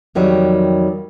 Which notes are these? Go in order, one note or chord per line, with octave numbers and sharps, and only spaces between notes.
F2 D#3 F#3 G3